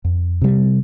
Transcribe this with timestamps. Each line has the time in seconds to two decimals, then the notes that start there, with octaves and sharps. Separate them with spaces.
0.05 F2
0.42 C3 G3